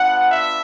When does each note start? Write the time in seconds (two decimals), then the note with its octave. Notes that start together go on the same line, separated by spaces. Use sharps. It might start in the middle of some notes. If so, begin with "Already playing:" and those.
Already playing: B3 D4 F4 F#5
0.29 E5